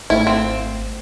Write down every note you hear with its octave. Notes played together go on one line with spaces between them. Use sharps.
G#1 A3 E4 F5
C4